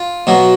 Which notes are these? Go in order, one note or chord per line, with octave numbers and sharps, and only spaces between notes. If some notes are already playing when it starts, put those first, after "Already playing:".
Already playing: F4
B2 F#3